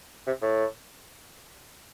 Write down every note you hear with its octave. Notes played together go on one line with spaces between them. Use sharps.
C3
A2